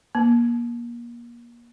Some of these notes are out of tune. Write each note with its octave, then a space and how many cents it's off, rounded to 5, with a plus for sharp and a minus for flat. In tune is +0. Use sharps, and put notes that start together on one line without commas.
A#3 +30